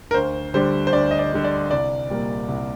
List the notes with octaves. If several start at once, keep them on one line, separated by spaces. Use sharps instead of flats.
A#4
D2 C5
D3 G3 D4 C5
C5
D2 D5
D#5
D5
D3 G3 D4
D5
C2 D5
A#2 G3 A#3
C2